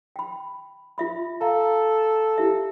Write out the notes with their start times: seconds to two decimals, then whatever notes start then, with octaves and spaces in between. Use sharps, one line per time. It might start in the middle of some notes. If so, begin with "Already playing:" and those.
0.16 G5 B5
0.98 F4 E5 B5
1.41 A4 F5 A#5
2.38 E4 G4 E5